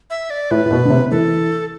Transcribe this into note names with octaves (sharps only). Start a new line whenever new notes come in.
E5
D5
A2 B4
A2
B2
D3
C3
E3 A4